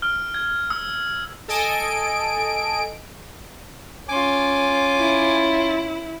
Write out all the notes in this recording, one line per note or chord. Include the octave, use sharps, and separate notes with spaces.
F6
G#6
E6
A4 D#5 G#5 D7
C#4 F4 G#5 D6
E4